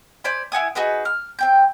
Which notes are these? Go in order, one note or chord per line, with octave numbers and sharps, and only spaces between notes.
C5 D5 G#5 B5
E4 F#5 G#5 D#6
D#4 F#4 G#4 B4
F6
C4 G5 G6